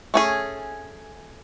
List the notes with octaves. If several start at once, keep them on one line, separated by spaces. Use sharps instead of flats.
A3 C#4 G#4